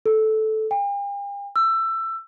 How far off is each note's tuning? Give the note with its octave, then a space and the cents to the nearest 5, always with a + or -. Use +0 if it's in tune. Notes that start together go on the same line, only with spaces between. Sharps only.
A4 -10
G5 +45
E6 +20